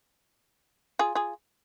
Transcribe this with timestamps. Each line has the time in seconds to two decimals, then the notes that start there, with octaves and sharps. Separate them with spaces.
0.99 F4 G#4
1.15 F4 G#4